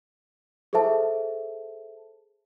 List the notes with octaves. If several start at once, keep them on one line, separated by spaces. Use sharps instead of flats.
G#4 A4 C5 E5 A5